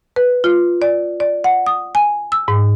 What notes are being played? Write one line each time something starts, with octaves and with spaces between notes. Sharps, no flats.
B4
F4
D5
D5
F#5
D#6
G#5
E6
G#2